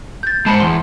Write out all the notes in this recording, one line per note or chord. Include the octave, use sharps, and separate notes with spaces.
G6 A6
G#3 B4 C5 A5 B5 C#7
E2 C6